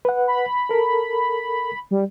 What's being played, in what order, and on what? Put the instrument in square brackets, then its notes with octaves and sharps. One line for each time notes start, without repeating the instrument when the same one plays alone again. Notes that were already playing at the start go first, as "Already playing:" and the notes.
[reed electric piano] B4 F#5
[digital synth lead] B5
[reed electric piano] A4 A#4
[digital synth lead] G3